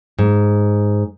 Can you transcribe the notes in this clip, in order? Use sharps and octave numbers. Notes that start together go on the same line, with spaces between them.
G#2